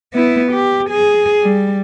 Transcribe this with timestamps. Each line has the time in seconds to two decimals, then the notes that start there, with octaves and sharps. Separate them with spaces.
0.14 B3 E4
0.52 G4
0.90 G#4
1.42 G3